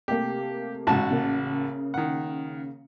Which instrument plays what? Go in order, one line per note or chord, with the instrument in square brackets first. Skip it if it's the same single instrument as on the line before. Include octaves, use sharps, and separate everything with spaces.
[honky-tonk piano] C3 A3 A#3 [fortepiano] G4
[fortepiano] A1 F#4 A5 [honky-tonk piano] G#2 C#3
[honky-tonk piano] C#3 A#3
[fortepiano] D#3 F#5